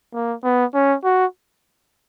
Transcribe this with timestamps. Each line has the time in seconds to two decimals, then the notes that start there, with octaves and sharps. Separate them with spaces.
0.14 A#3
0.44 B3
0.75 C#4
1.04 F#4